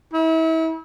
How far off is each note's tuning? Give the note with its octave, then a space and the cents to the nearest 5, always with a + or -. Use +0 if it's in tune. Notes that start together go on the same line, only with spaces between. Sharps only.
E4 -35